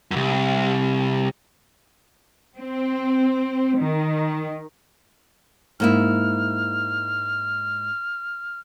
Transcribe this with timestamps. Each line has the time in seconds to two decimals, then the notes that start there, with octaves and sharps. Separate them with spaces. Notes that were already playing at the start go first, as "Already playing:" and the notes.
0.11 C2 F#2
2.58 C4
3.78 D#3
5.80 G#2 A#3 E4 F6